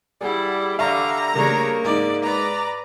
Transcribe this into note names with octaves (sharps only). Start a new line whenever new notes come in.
G3 E4 G#4 D5 F#5
D3 G3 E5 F5 A#5 C#6 D6
C#3 G3 A3 A#3 D4 C#5
G#2 D#4 D5
B4 D5 A#5